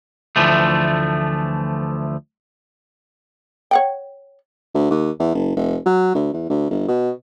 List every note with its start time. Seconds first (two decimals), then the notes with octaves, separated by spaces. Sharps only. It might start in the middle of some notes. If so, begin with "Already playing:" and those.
0.36 D2 E3 F3 A3
3.71 C#5 F#5 G5
4.74 D2
4.91 D#2
5.20 E2
5.34 F#1
5.56 F1
5.86 F#3
6.14 D2
6.33 E2
6.49 D2
6.70 G1
6.88 B2